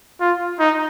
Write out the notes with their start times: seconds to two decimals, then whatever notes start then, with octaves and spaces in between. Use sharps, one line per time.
0.21 F4
0.59 D#4